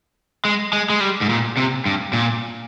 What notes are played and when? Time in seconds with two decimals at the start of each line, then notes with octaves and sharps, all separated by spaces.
0.45 G#3
0.73 G#3
0.90 G#3
1.01 G3
1.21 G#2
1.29 A#2
1.57 C3
1.86 G2
2.13 A#2